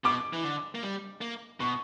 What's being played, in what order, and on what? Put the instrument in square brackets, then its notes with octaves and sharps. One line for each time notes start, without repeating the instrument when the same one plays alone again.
[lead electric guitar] B2 [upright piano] D6
[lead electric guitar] E3
D3
A#3
G3
A#3
[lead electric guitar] B2 [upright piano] C#6